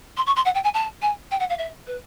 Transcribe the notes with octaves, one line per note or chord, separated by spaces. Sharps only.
C6
C#6
C6
F#5
G5
G#5
A5
G#5
G5
F#5
F5
E5
B4